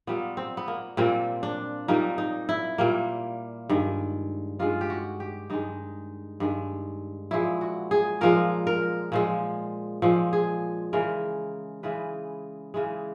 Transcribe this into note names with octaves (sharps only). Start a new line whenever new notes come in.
A#2 G3 A#3 B3
C4
B3
A#3
A#2 G3 A#3 C4
D4
A#2 G3 A#3 D#4
D#4
E4
A#2 G3 A#3
G2 D#3 G#3
G2 D#3 G#3 F4
G4
F#4
G4
G2 D#3 G#3 D#4
G2 D#3 G#3
A#2 F3 G#3 E4
F#4
G#4
A#2 F3 G#3 A#4
A#4
A#2 F3 G#3
A#2 F3 G#3
G#4
C#3 E3 G#3 A#4
C#3 E3 G#3 B4
C#3 E3 G#3